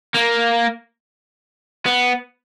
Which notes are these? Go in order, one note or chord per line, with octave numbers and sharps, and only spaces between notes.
A#3
B3